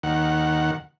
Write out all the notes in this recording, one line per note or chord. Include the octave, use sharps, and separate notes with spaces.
D#2 F#5